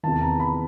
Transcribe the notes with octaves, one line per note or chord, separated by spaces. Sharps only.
E2 C3 D#3 A5
A#5
B5